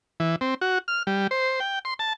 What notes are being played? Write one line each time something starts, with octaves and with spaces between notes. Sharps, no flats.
E3
C4
F#4
F6
G3
C5
G5
C6
A5